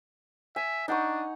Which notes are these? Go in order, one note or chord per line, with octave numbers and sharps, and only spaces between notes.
E5 G#5
D4 D#4 F#5 C#6